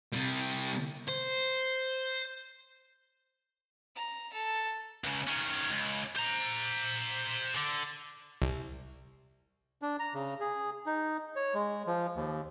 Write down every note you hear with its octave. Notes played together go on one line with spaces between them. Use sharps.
C3 G3
C5
A#5
A4
C#2 C#3
D#3 C#4
C#2
C5 A#5
D3
C2
D4
A#5
C#3
G#4
D#4
C#5
G#3
F3
D#2